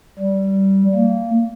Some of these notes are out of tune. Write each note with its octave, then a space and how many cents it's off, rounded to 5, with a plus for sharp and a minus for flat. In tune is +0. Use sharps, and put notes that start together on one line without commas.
G3 -15
A#3 -20